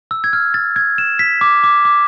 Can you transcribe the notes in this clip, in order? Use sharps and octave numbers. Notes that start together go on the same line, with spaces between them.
E6
G#6
F6
A6
G#6
E7
B6
D6
D6
D6